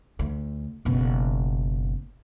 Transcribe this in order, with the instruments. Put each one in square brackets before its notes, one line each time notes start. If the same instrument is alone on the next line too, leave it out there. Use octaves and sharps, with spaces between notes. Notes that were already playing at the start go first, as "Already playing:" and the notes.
[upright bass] D2
F#1 B2